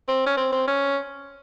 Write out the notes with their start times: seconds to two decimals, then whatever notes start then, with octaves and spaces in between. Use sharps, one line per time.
0.08 C4
0.26 C#4
0.37 C4
0.53 C4
0.68 C#4